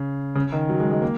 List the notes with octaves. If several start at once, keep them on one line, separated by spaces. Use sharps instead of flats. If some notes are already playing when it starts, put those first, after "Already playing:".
Already playing: C#3
C#3
D#3
F#3
G#3
G#3
A#3